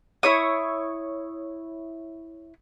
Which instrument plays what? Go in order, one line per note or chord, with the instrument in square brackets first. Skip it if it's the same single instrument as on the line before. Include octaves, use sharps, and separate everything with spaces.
[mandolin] E4 C#5 D#6